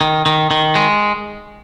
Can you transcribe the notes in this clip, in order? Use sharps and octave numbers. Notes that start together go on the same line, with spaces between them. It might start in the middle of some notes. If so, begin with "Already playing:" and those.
D#3
D#3
D#3
G#3